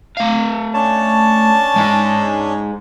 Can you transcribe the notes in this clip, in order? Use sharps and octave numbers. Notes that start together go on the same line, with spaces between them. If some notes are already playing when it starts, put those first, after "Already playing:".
A3 F5
C#4 D4 C#5 A5
G#3 D#4